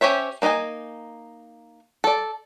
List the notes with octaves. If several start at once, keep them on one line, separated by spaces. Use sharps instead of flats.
C#4 G4 C5 C#5 E5
A#3 D#4 B4 D#5 G#5
A4 D5